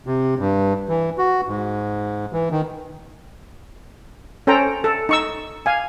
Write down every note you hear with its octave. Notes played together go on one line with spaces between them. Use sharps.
C3
G2
E3
F#4
G#2
E3
D#3
C#4 A4 C5 G5 A#5
A4
D#4 C#6 E6
F5 G#5